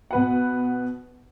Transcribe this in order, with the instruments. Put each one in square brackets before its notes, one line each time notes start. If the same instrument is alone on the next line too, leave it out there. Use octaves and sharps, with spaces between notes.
[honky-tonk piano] B2 B4 F#5